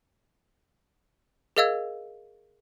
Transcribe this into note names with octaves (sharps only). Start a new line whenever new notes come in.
G#4 A#4 D#5 F5 E6 G#6